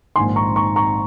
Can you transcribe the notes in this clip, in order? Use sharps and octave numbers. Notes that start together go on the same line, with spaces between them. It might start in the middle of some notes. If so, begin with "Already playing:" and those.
A#1 G#2 D#3 G#5 C6
A#5 C#6
A#5 C#6
A#5 C#6